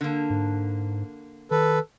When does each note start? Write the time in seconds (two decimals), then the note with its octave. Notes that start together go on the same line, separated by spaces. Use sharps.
0.01 D3 A#3
0.30 G#2
1.51 D#3 A4 B4